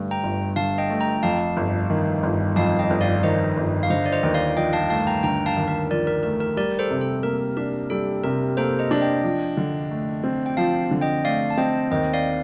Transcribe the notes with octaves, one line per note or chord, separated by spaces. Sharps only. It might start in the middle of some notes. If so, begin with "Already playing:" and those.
Already playing: G2 D3 A3
G5 A#5
G1
D3 F5 A5
D#5 G5
A3
G5 A#5
F2 F5 A5
G1
D#3
G1
F2 F5 A5
D#5 G5
G1
D5 F5
D#3 C5 D#5
G1
F5
D3 C5 D#5
D5
C5 D#5
D#2
D5 F5
F3 D#5 G5
F5 A5
A3 F5 A5
G5 A#5
D3 G5 A#5
F5 A5
D#2
A#4
F3 A#4 D5
A#4
A3 A#4
A#4
G3 A#4 D5
A4 C5
C3
A4
A#3 A#4
D4 A#4
G3 A4
C3 A#4
A#3 A4 C5
C5 D#5
D4
D#5 G5
F3
D3
A3
C4
G5
F3 F5 A5
D3
D#5 G5
A3 D5 F5
A5
C4 D#5 G5
D#2 D#5 G5
D5 F5